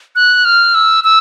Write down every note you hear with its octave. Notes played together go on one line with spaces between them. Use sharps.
F#6
F6
E6
E6